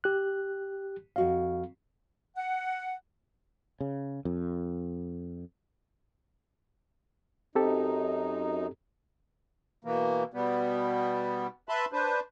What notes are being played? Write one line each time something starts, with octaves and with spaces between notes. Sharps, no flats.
G4 F#6
F2 F#4 D#5 F5
F#5
C#3
F2
F#2 C4 D#4 G4 A4
B2 E3 A#3
B2 G3 B3
B4 E5 A5 B5 C6
D4 B4 C5